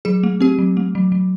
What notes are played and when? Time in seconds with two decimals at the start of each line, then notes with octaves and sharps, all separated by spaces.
0.05 F#3 G#4
0.23 A3
0.40 C4 G4
0.59 F#3
0.77 A3
0.95 F#3
1.12 F#3